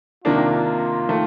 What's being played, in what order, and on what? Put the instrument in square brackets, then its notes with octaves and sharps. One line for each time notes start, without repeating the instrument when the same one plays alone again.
[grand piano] C3 D#3 A#3 D4 [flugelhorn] F4
[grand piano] D#3 A3